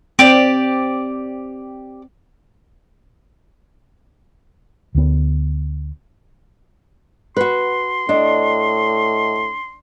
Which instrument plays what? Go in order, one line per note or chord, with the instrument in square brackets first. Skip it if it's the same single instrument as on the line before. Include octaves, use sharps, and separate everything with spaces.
[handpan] C4 [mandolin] G4 D5
[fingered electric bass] D2 B3
[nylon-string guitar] F#4 B4 [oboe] C6
[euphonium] A2 [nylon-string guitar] D4 [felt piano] D#5